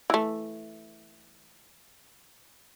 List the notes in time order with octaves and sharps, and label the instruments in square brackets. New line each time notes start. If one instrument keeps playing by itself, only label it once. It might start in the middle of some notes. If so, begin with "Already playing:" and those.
[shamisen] E3 A3